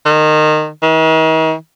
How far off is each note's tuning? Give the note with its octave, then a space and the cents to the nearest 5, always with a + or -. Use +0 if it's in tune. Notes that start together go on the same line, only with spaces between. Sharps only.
D#3 -20
D#3 +45